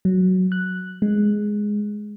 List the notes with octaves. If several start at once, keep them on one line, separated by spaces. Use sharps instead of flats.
F#3
F#6
G#3